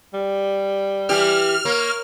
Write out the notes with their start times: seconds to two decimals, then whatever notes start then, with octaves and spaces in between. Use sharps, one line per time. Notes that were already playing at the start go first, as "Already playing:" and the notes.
0.14 G3
1.09 E3 G4 F6
1.65 A#3 C#5